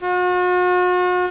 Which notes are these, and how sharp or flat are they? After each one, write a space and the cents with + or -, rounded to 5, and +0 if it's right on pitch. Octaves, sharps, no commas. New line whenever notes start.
F#4 -45